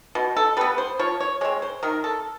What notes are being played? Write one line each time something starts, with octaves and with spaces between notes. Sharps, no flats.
B2
A4
G3 B3 B4
C5
F3 C#5
C#5
G#3 C4 C#5
C5
D#3 A#4
A4